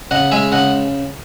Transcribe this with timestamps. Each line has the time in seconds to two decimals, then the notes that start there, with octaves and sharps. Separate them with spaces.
0.11 C#3 D#5 F#5
0.31 G#3 E5 G#5
0.52 C#3 D#5 F#5